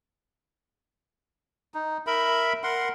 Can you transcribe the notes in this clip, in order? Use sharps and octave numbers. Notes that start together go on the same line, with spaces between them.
D#4
A#4 E5 B5
A#4 F#5 C6